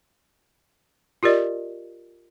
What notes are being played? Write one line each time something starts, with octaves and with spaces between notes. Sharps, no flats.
F4 G4 A#4 D5 D#5